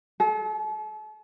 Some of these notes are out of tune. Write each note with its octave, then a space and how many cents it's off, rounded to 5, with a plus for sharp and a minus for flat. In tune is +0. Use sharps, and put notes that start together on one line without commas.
A4 -40